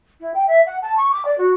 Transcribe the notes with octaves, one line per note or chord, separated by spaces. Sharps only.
E4
G5
E5
F#5
A5
C#6
D6
D5
F#4